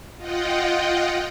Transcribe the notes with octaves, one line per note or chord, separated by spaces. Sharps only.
F4 D#5 F#5 G5